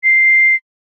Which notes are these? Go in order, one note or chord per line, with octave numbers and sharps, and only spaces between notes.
C7